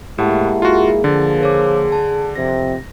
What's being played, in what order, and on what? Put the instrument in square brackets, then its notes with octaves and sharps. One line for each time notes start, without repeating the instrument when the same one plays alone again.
[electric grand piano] A2 [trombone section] G#3 A#3 E4 [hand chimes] G4 F#5 A5
[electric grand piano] F4 F#4 [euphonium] G#4
[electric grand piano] D3 [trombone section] F3 A#3 [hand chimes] A6
[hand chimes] A#4 C#5 D6
A5
[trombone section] F2 C3 [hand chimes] A#6